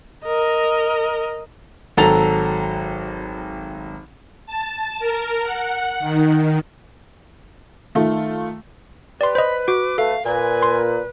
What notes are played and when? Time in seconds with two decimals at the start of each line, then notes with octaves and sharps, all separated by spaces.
0.25 A#4 D#5
1.97 G#1 F#3 A4 A#5 A6 F7
4.46 A5
4.99 A#4
5.43 F#5
6.00 D#3
7.95 D#3 A3 F4
9.21 G4 B4 D5 C6
9.35 C5 D#5 B5
9.68 F#4 D6
9.98 A3 A4 F5
10.25 A#2 B4 G#5
10.63 C6